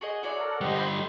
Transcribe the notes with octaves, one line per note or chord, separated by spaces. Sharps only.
F#4 G#4 D#5
E4 F#4 G#4 C#5 D5
A4 A#4 F#5
D3 G3 G4 C5 D#5 F#5
E5 B5 C6
A2 F#3 D#4